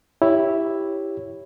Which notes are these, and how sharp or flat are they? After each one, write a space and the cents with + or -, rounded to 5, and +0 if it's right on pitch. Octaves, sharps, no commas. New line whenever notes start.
E4 +0 G4 +0 C#5 +0